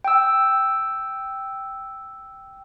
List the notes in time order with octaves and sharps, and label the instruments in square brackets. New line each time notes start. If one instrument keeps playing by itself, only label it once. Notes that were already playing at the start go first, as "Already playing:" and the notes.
[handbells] G5 E6